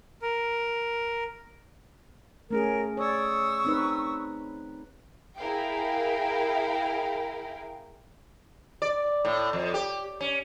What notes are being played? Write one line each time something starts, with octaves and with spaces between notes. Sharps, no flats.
A#4
A3 C#4 G#4 A#4
C#5 D5 C#6 D#6 E6
C4 D#4 B4
E4 G#4 A#4 F5 G5
D5
A2
F2
G4
C#4